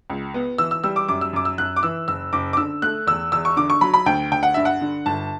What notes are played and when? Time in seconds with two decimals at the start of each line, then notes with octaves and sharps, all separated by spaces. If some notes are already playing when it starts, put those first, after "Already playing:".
0.10 C#2
0.34 B3
0.58 E3 E6
0.71 E6
0.84 G3 E6
0.96 D6
1.08 F#2 D6
1.21 E6
1.33 F#2 D6
1.45 E6
1.58 F#2 F#6
1.76 D6
1.83 E3 E6
2.08 F#1 E6
2.33 F#1 D6
2.53 D6
2.57 D3 E6
2.82 A3 F#6
3.07 E2 E6
3.32 E2 E6
3.45 C#6
3.57 D3 D6
3.70 C#6
3.81 F#3 B5
3.94 B5
4.06 D2 G5
4.31 D2 G5
4.43 F#5
4.54 G2 E5
4.65 F#5
4.81 D3
5.06 G1 A5